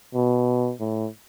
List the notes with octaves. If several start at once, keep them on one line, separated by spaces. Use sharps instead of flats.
B2
A2